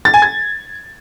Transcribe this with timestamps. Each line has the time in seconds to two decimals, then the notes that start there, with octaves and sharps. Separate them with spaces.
0.05 A6
0.14 G#5
0.22 G#6